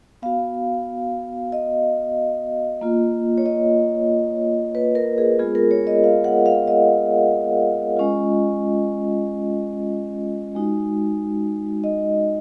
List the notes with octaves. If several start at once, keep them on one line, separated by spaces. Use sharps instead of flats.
B3 F#4 F5
D#5
A#3 F4
C#5
D#5
B4
A#4
G#4
G#3 B3 F4 G#4
A#4
C#5
D#5
F5
F#5
F5
D#5
G#3 C#4 F4
G#3 D#4 F#4
D#5